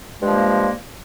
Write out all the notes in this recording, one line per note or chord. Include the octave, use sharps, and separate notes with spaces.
G2 F3 G#3 A#3